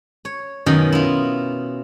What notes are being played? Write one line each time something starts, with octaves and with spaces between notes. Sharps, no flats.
C#5
F#2 B2 D#3 C#4 A#5
E4 F4